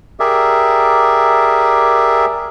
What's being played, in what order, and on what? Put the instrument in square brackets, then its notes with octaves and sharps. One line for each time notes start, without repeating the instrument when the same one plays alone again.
[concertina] G4 G#4 A#4 D5 E5